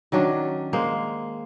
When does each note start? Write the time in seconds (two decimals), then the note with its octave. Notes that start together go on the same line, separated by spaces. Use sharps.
0.12 D#3 F#3 C#4 D4
0.73 G#3 A#3 C5